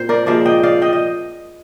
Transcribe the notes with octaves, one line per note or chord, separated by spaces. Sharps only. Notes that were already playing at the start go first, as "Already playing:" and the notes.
Already playing: A#2 C4 C5
A#4 D5
A#2 F3 G#3 D4 D5 F5
D#5 G5
D5 F5
D#5 G5
D#5